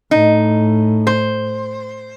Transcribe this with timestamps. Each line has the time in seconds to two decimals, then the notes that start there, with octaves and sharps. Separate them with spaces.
0.11 A2 D#4
1.07 C5